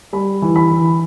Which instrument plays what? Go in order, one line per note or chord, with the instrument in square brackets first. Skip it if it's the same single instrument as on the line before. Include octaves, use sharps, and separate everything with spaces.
[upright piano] G3 B5
E3
B5
E3